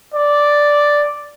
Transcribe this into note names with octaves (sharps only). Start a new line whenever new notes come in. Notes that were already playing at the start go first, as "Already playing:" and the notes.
D5